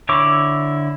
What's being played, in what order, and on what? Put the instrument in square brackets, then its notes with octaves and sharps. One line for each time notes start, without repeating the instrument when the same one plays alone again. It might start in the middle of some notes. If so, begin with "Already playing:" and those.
[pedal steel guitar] D3 E4 C#5 C#6 D6